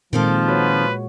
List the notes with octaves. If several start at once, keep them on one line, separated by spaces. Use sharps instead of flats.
A#2 D#3 F3 G#3 C4 A4
F#4 B4 C#5